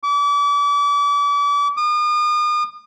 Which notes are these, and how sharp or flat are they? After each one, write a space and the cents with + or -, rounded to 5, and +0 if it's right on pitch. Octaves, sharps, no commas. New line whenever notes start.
D6 -35
D#6 -40